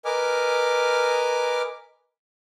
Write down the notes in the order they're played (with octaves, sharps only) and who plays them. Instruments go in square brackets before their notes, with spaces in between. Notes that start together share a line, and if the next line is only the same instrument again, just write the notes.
[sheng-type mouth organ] A#4 B4 D#5 G#5 D6 F6